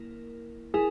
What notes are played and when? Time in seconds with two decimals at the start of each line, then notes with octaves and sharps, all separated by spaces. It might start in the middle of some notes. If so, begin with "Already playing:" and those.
Already playing: A#3 E4 A#4
0.74 E4 G#4 A#4